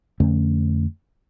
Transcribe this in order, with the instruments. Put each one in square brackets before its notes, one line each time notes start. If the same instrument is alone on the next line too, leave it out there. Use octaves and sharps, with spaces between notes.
[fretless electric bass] F2 D3 A3 C#4